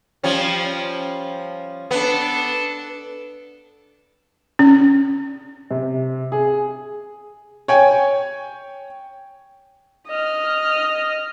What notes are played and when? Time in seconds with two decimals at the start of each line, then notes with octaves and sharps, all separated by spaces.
0.23 F3 G3 C#4
1.91 B3 D4 A4
4.59 C#4
5.71 C3
6.32 G#4
7.68 C#5 G5 G#5
10.09 D#5 F6